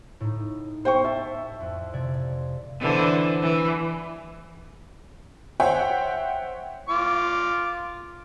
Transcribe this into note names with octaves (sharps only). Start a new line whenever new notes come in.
A2 D#4
C5 G5 C#6
E5 A5
F2
C3 D5 G#6
D3 E3 C5
E3
C5 C#5 E5 F#5 G5
F4 D6